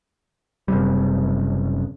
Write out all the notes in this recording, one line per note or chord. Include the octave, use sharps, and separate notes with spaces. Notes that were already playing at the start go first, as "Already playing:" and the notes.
F#1 C3 G3